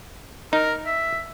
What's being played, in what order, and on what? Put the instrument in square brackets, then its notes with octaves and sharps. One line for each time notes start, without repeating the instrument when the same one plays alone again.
[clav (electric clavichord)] D#4 [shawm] A#4
[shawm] E5